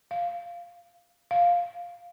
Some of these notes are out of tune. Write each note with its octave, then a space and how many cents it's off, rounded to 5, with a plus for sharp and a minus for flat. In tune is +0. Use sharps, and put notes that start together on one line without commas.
F5 -5
F5 +5